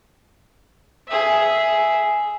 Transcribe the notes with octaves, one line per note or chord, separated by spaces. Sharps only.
G#4 E5